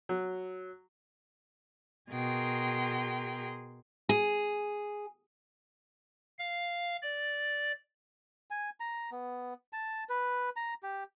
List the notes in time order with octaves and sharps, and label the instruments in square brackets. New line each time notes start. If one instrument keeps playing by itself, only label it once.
[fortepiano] F#3
[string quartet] B2 G#4 A#4 G5 C6
[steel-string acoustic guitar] G#4
[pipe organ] F5
D5
[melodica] G#5
A#5
B3
A5
B4
A#5
G4